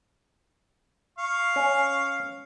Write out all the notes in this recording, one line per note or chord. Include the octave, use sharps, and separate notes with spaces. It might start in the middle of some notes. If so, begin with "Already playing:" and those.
F5 C#6
C#4